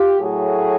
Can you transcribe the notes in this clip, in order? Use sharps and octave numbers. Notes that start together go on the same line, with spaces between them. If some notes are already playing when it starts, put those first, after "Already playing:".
Already playing: F4 G4
A2 F#3 A3 F#4 G#4